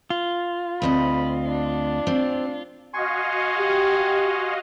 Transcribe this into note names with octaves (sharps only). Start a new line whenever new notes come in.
F4
D2 C4 D#5 B5
D4
C4
F#4 D#5 F5 G#5 C6 C#6
G4